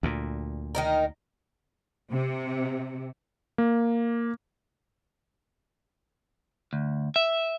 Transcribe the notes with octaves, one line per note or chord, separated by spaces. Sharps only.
D2 A#2
D#3 D#4 A#4
C3
A#3
D2
E5